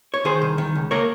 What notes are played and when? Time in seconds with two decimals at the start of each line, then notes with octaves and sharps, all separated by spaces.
0.14 C#5
0.25 D#3 G#4 C5
0.42 C2
0.58 D#3
0.75 C#2
0.91 A#3 A#4 C#5